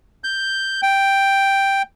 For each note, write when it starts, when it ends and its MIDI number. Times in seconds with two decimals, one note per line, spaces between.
0.24 0.81 91
0.82 1.82 79